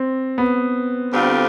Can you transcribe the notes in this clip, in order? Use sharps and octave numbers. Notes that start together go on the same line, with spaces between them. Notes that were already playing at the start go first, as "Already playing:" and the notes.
Already playing: C4
B3
D2 D3 G3 C4 F4